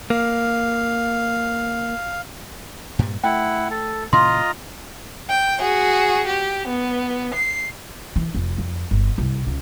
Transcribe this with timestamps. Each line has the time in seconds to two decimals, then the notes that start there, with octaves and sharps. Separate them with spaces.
0.10 A#3 F5
2.99 G2 A#2 G3
3.24 A3 E4 F#5 G5
3.70 A4
4.13 A#2 C#3 E3 F4 D#5 A#5 C6
5.30 G5
5.59 F#4 G#4
6.27 G4
6.68 B3
7.34 C7
8.16 E3
8.35 F1
8.58 F2
8.91 G1
9.18 C2
9.47 C#2